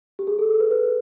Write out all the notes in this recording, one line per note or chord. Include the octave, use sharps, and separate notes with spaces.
G4
G#4
A4
A4
B4
B4